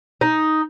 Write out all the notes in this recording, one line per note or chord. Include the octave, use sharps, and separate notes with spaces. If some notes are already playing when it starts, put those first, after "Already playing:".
D#4